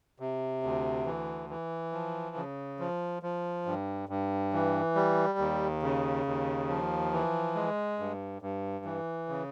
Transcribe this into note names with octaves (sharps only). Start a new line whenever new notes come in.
C3
D2
E3
E3
F3
C#3
F3
F3
G2
G2
E3
G3
D#2
C#3
D#2
F3
E3
G#3
G2
G2
E3
C#3